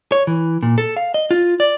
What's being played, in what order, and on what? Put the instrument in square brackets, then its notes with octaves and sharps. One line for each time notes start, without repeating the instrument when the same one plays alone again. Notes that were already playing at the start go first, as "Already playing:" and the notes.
[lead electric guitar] C#5
E3
A#2
A4
F5
D#5
F4
D5